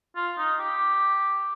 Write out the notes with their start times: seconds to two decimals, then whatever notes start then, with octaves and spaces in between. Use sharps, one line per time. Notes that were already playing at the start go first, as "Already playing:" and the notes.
0.16 F4
0.38 D#4
0.60 G4